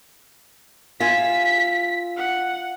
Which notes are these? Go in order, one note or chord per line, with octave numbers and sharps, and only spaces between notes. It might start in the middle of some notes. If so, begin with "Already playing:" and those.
F4 E5 G#5 B6
F#5